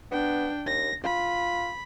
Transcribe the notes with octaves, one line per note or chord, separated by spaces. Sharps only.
B3 D4 G5
D#2 A#6
F4 B5